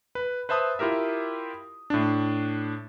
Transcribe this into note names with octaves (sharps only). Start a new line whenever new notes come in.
B4
B4 C5 E5 A5 D#6
E4 F4 G4 A#4 E5
A2 D4